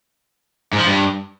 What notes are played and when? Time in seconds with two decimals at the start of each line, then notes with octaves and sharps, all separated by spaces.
0.73 G#2
0.79 F3
0.85 G2